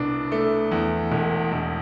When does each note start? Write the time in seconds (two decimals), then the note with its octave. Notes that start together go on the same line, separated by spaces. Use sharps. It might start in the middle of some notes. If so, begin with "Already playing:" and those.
Already playing: C2 B2 D4
0.32 A3
0.72 E2
1.12 E1
1.52 E1